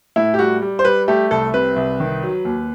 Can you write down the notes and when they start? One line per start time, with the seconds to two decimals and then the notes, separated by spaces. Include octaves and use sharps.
0.16 A2 E4
0.34 G4
0.39 G3 F#4
0.62 G3
0.79 C5
0.84 G3 B4
1.08 A3 G4
1.31 C2 A4
1.54 C3 B4
1.76 C2
2.00 D#3
2.23 F#3
2.45 D#2